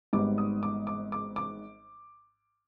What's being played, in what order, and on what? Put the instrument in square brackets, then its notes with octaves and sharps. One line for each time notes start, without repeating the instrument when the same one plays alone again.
[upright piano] G#1 G#2 G3 B3 D6
D#6
D6
D6
D6
D6